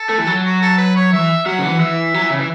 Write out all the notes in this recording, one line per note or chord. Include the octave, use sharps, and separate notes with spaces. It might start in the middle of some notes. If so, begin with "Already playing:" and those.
Already playing: A4
A3
E3
F#3
F#4
A4
B4
C#5
E3 E5
F#3 F#5
C#3
E3
E3 E5
F#3
E3
C#3
E3